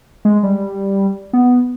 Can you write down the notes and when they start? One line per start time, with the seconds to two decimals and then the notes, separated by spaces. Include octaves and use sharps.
0.25 G#3
0.43 G3
1.33 B3